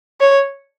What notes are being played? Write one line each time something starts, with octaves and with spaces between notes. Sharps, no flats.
C#5